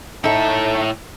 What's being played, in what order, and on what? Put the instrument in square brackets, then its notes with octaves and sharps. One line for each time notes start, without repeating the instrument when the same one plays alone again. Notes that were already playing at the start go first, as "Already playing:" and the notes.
[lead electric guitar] A2 E5 [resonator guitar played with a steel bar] D#4 A4